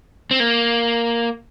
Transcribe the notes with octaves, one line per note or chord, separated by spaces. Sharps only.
C4
A#3